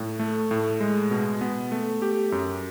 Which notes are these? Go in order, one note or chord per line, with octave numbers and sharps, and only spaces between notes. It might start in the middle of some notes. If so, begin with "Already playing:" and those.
Already playing: A2
A3
A2
G#3
B2
B3
A3
G4
F#2